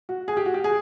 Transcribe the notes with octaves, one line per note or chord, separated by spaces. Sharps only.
F#4
G#4
G4
F#4
G4
G#4